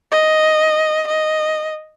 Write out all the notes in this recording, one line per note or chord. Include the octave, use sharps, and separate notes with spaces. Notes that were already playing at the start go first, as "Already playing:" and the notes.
D#5
D#5